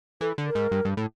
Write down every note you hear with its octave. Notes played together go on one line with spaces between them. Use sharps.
E3 A4
D3
A#4
G#2
G2
G2
A2